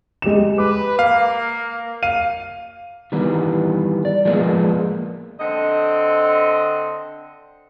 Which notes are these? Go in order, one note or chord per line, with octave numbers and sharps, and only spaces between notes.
G#3 G4 E7
B4 D6
A#3 F5
F5 D#7
D#3 E3 G3 B3
D5
F3 G#3 A#3 B3
D3 C4 D#5